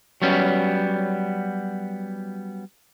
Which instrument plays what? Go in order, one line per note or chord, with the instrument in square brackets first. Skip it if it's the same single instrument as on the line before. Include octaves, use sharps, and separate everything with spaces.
[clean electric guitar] F#3 G3 B3 C#4